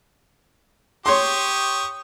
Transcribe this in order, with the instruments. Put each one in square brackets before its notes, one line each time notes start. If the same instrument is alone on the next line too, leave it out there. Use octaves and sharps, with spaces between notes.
[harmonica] G4 C#6 D#6 [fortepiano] C#5 C6